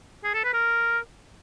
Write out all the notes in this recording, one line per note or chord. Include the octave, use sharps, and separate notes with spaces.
G#4
A4
B4
A#4